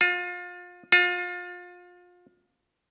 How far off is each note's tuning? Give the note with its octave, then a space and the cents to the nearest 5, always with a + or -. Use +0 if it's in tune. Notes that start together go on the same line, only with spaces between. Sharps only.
F4 +30
F4 +30